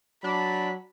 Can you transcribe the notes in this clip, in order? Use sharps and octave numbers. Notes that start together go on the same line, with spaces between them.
F#3 D4 B5